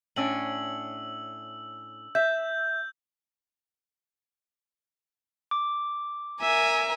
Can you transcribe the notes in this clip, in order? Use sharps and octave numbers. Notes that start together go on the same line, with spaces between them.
A2 C#4 D4 E6 F#7
E5 G6
D6
A#4 E5 G#5